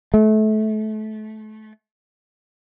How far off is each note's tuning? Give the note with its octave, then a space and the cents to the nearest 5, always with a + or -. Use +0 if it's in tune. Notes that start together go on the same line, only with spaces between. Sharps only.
A3 -30